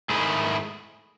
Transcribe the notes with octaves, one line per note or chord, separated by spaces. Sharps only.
G#2 D#3 A3 E4 G#4